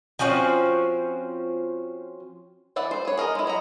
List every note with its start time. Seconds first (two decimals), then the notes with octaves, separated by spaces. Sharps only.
0.19 F3 C4 C#4 F#4
2.76 E3 D5 E5 F#5
2.91 C5
3.05 B4 C#5
3.17 G#4 A#4 B4 D#5
3.35 G#3 E4
3.47 F#3 D#5 A#5